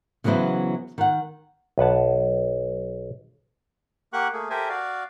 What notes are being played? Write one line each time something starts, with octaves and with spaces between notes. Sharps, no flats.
C#3 E3 F#3 B3 E4 C5
D#3 F#5
B1 B4 F#5 A5
A#3 G4 F#5 C#6 F#6
A3 A#3 G#4
G4 A4 A#4 C5 E5 G#5
F#4 D5 F5